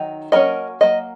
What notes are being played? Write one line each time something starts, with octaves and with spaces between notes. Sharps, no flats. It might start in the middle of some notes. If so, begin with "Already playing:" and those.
Already playing: D#3 F#3 D#4
F#3 A#3 C#4 A#4 D#5
F#3 A#3 D#5